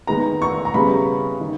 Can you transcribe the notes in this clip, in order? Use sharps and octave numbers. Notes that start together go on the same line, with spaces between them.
D#3 G#3 B3 A#5
C#6
A#5
C#3 G3 B3 B5
D#3